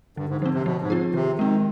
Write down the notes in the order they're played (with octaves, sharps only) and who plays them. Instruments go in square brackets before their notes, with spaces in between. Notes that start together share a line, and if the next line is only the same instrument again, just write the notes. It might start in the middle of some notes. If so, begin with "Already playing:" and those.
[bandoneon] G2 [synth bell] D3
[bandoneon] G#2
[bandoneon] G#2 [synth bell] F3 C4
[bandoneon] C3
[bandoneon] B2 [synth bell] F3
[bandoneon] G#2
[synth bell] C4 F4 G#4
[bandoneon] C3 [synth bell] D#3
[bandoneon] D#3 [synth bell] G#3 C4